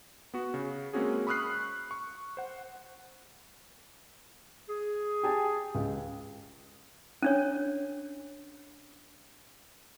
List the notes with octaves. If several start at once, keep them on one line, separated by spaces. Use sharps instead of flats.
B3 F#4
C#3
G#3 A#3 C4 C#4 F#4 G#4
B5 C#6 D#6 F6 F#6 C7
C#6
C5 F#5
G#4
G4 G#5 A5
C#2
C#4 D4 C#5